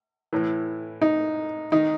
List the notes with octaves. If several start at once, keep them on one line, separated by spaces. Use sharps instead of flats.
A2 E3
D#4
D#3 D#4